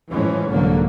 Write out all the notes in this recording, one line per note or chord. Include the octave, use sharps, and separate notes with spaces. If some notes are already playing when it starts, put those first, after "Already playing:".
F#2 A2 E3 F3 G#3 C#4
C2 G#2 D3 F#3 A#3